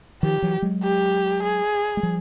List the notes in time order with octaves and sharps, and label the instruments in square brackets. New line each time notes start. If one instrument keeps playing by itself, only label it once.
[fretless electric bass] D#3 F3 [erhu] G4
[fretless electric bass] E3 F#3
F#3 G#3
[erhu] G4
G#4
[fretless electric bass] G#3
F3 G3